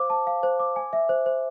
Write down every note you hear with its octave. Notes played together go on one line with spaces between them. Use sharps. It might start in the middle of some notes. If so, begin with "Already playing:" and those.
Already playing: C5 F5 D6
A5
F5
C5
D6
G#5
E5
C5
C5